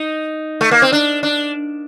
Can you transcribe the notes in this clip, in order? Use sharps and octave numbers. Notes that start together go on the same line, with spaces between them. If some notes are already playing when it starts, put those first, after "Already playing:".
Already playing: D#4
A3
A#3
C4
D4
D4